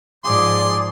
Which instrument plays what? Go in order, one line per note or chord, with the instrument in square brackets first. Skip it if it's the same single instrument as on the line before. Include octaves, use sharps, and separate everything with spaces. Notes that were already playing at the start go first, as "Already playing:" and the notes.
[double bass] G#2 F3 [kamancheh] G#4 D5 [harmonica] C6 [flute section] D6 D#6